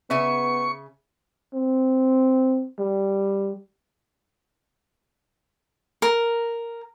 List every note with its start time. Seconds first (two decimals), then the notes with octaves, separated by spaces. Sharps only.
0.10 C#3 B3 E5 G#5 C#6
1.54 C4
2.79 G3
6.02 A#4